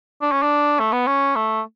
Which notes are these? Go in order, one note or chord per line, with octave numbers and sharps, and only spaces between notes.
D4
C#4
D4
A3
B3
C#4
A3